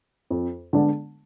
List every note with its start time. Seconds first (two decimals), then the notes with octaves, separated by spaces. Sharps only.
0.30 F2
0.73 D3 G#3 B3 D4